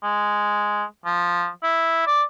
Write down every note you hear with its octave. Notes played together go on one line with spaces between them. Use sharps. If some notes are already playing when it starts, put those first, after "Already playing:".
G#3
F3
E4
D5